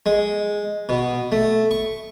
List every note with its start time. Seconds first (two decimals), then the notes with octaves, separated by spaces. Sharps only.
0.06 G#3
0.89 B2
1.32 A3
1.71 C#6